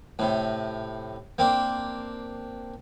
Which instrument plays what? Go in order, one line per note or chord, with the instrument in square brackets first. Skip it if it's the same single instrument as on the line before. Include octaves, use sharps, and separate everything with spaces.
[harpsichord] A2 C3
A#3 C4 D4